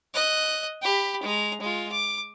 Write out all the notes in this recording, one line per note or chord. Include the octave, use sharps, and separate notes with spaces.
D#5 F#6
G4 B5
G#3 A#5
G#3 F4
D6